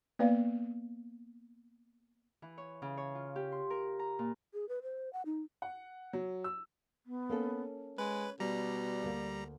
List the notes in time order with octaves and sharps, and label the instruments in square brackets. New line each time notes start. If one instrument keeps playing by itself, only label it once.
[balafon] A#3 B3 B4 D5 F5
[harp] E3
C#5
C#3
C#5
F4
G4
C6
A#4
A#5
A#2
[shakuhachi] G#4
B4
C5
F#5
D#4
[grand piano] F#5
F#3
E6
[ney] B3
[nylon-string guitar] A#3 C#4 A4
[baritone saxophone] G#3 [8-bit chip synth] B4 [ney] C#5
[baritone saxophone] B2 [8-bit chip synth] G3 A#5 [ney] D5
[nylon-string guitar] D2 A#3